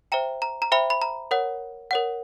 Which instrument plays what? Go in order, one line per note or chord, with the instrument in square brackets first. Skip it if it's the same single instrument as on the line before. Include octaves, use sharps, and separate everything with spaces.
[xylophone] C5 E5 G5 A#5
A#5
A#5
C5 E5 G5 B5
B5
A#5
A#4 C#5 F#5
A#4 C#5 F#5